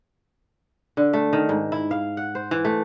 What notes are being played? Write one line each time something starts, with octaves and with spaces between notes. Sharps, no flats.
D3
A3
D#3
G#2
E4
F5
F#5
C5
E3
A3